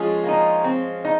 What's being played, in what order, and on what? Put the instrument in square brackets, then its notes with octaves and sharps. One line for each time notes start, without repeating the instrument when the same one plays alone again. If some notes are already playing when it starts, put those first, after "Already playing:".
Already playing: [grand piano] F3 G#3 C#4 F4 G#4
[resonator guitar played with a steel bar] A#3 D#4
C4
D#4